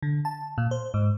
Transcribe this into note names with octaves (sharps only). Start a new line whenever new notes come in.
D3
A5
A#2
C5
G#2